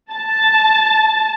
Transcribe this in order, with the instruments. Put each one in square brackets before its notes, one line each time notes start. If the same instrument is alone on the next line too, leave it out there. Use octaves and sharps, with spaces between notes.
[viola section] A5